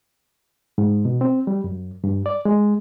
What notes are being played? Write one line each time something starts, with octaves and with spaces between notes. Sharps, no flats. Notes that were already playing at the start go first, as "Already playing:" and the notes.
G#2
B2
C4
G3
F#2
G2
D5
G#3